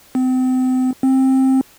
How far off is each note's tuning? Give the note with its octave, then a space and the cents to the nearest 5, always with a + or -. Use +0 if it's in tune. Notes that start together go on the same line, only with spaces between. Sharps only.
C4 -35
C4 +15